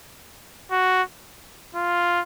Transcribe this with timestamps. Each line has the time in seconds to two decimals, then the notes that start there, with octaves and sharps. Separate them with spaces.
0.71 F#4
1.75 F4